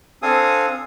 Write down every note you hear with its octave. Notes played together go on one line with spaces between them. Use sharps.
C4 D4 A4 F5 G#5 D#6